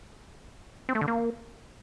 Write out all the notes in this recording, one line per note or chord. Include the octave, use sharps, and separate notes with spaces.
C4
A3
D3
A#3